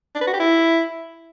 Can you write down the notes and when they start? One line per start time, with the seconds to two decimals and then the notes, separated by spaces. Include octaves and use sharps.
0.15 D4
0.21 B4
0.27 F#4
0.33 G4
0.40 E4